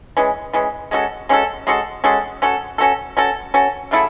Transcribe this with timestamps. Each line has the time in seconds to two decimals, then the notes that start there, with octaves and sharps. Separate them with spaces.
0.17 E3 G#3 C#4
0.53 E3 G#3 C#4
0.91 G#3 C#4 F#4 A4
1.29 G#3 C#4 F#4 A4
1.67 G#3 C#4 F#4 A4
2.04 G#3 C#4 F#4 A4
2.42 C#4 F#4 A4
2.78 C#4 F#4 A4
3.17 C#4 F#4 A4
3.54 C#4 F#4 A4
3.91 C#3 F#3 A3 E4